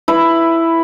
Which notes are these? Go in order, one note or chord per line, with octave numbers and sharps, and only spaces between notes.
E4 B4